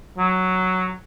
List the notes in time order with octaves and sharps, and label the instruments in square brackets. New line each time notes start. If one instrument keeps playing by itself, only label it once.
[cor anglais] F#3